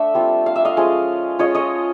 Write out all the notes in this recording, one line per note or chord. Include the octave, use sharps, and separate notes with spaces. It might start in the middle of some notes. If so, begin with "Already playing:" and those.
Already playing: A3 D4 E5
G3 C4 F4
F5
E5
D#5 F5
F3 G#3 C#4 F4
G#3 C#4 F4 C#5 D#5
C#5 D#5